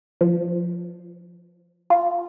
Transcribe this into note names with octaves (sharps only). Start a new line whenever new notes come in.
F3
F4